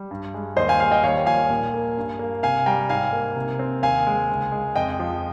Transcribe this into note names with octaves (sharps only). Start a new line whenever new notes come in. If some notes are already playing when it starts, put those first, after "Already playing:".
Already playing: G3
G2
G#3
D#2 C5 D#5
F5 G#5
G3 F5 G#5
D#5 G5
D#2 C#5 F5
F3 F5 G#5
A#2
A#3
G2
A#3
C3 F5 G#5
G3 G5 A#5
G#2 F5 G#5
A#3
C3
C4
D#2 F5 G#5
G#3
C#2
G#3
F2 D#5 G5
F3